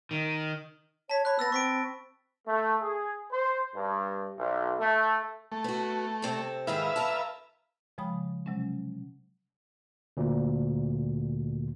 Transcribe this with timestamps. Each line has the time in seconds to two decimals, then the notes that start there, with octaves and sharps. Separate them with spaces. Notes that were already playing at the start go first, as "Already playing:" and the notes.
0.11 D#3
1.10 C#5 A5 B6
1.25 C#5 B5 F#6
1.39 B3 E6 A6 A#6
1.52 C4 C#6 B6 D7
2.48 A3
2.82 G#4
3.32 C5
3.76 G2
4.38 B1
4.80 A3
5.52 A3
5.64 B3 F#4
6.22 C3 C4 A4
6.67 G#2 D#3 G#4 B4 E5 F5
6.96 A5 A#5
7.98 C#3 F3 G#3 G5 B5 D#6
8.46 C3 F#3 G#3 C#4
10.17 D2 A#2